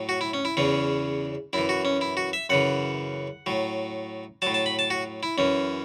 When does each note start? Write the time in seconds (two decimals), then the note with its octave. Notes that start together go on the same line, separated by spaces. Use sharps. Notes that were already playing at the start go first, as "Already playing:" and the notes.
Already playing: A2 F#3
0.09 F#4
0.21 E4
0.34 C#4
0.45 E4
0.57 E2 C#3 E3 C#4
1.53 F#2 E3 E4
1.69 F#4
1.85 C#4
2.01 E4
2.17 F#4
2.33 E5
2.50 F#2 C#3 E3 F#5
3.46 A2 F#3
4.42 A2 F#3 A5
4.54 A5
4.66 B5
4.79 A5
4.90 F#4
5.23 E4
5.38 F#2 E3 C#4